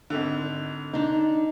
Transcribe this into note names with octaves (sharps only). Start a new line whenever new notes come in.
G#1 D3
D4 D#4